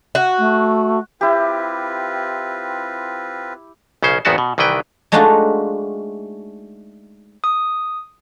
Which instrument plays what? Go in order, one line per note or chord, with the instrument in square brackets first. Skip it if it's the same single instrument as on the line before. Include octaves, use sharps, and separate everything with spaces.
[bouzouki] F#4
[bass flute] A3
[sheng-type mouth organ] C4 F4 B4 [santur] E4 G4
[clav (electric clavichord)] B1 C#3 C#4 C5
G#1 E2 D#3 B3 F#4 A5
B2
C2 D#3 E3 B4 G5
[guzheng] G#3 A3 D4 D#4 F4 F#4
[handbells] D#6